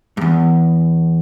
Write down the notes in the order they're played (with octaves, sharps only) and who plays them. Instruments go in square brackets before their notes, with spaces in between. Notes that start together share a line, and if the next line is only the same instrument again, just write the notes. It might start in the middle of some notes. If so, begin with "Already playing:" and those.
[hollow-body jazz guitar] E2 G2